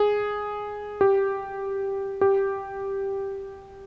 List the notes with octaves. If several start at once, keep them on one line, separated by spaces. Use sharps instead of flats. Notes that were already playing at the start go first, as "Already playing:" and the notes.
Already playing: G#4
G4
G4